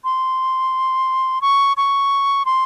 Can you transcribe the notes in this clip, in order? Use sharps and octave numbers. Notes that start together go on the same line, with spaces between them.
C6
C#6
C#6
C6